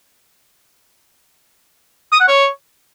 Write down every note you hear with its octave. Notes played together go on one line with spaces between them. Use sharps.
D#6
F#5
C#5